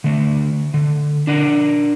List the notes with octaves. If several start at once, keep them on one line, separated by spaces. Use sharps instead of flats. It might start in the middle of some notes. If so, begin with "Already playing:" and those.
D3 A3
D3
D4 A#4 D5 F#5